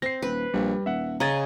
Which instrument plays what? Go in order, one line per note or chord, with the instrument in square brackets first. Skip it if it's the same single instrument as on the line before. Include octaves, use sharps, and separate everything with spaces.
[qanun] C4 [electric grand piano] A#6 C7
[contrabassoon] D#1 [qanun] B4
[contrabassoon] A#1 [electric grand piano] G3
[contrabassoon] D#1 [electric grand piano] E5 F#5
[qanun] C#3 D#5 [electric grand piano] A#5 G#6 A6